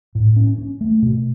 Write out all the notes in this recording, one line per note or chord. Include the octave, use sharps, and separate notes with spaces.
A2
C#4
C#4
A3
B2